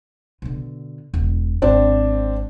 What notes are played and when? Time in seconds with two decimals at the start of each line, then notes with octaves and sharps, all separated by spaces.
0.42 B2 D3
1.14 E1
1.62 G#1 C4 D4